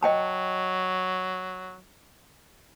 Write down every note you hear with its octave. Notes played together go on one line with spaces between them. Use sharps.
F#3 D#5 G5 A5